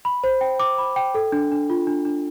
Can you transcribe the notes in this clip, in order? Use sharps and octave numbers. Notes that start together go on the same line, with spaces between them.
B5
C5
G5
D6
B5
G5
A4
D4
D4
F4
D4
D4